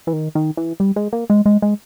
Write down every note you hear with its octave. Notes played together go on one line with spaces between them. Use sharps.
E3
D#3
D#3
E3
G3
G#3
A#3
G#3
G#3
G#3